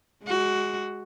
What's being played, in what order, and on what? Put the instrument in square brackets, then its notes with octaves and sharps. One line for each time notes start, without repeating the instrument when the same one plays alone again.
[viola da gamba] G#3 F#4